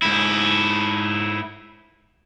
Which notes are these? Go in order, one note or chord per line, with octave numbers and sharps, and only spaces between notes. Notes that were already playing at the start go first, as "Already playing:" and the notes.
G#2 E4